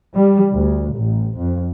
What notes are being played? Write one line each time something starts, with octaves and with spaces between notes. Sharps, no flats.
G3
D2
A1
F2